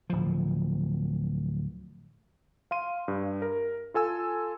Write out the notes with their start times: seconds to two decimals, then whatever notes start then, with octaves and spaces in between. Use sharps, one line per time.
0.10 D1 F3
2.71 F5 C6 D#7
3.08 G2
3.42 A#4
3.94 F4 A4 G#5 E6